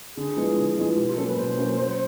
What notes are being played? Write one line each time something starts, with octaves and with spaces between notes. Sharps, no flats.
D3 G#4
F3 G#3 B3 E4
D3
F3 G#3 B3 E4
B2 G4
F4
F#3 A#3 C#4 A4
B4
B2 C5
F#3 A#3 C#4
F#3